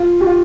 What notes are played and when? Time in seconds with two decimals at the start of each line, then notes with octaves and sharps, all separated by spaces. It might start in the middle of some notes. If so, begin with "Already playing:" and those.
Already playing: F4
0.21 G4
0.26 F4